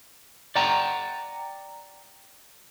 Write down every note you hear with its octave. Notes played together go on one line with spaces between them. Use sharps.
D5 F#5 G5 A#5